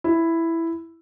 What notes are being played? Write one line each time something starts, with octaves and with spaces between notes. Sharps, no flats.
E4